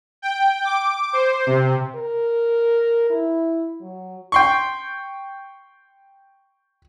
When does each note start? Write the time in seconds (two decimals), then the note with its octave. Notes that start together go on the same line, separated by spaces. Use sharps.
0.22 G5
0.64 D6
1.13 C5
1.46 C3
1.95 A#4
3.10 E4
3.80 F#3
4.32 G5 C6 C#6